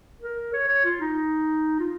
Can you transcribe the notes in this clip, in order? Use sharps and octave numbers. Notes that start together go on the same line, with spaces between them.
A#4
C#5
C#5
F4
D#4
F4